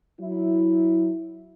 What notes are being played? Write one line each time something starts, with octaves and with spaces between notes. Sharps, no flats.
F#3 E4